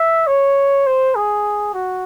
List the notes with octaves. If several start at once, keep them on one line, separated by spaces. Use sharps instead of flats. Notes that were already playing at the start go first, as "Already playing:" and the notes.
Already playing: E5
C#5
C5
G#4
F#4